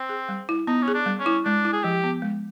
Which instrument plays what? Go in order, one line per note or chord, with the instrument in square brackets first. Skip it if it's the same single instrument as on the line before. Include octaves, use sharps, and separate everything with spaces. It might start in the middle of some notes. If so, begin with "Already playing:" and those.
Already playing: [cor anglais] C4
[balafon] G#4
G3
E4
[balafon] B3 [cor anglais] D#4
[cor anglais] C#4
[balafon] G#4
[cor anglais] D4
[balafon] G3
[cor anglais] C#4
[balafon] E4
[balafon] G#3 [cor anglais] D4
[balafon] E4
[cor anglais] G#4
[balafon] F3 [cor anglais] G4
[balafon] B3
G#3